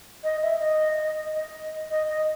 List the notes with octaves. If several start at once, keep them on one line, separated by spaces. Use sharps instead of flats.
D#5
E5
D#5
D#5
D#5
D#5